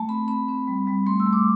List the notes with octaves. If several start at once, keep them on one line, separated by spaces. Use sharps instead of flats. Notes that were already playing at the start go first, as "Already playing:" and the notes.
Already playing: A3 A5
C4 B5
C4 B5
C4
G3
G3
A3 C6
E6
A3
D6